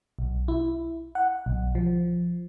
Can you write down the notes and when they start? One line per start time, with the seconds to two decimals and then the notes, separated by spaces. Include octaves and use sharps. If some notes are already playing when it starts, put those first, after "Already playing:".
0.19 B1
0.48 E4
1.15 F#5
1.46 B1
1.75 F3